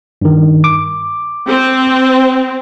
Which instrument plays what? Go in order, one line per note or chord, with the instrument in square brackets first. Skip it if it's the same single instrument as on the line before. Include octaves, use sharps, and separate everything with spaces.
[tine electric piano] G2 D#3
D6
[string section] C4